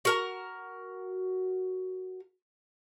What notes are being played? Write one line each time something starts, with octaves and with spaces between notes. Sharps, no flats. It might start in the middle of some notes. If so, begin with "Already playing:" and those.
F#4 A#4 A#5